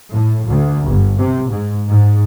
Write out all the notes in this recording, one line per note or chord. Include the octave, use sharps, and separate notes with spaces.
A2
D2
G1
C3
G#2
G#2